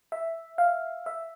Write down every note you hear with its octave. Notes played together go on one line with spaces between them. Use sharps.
E5
F5
E5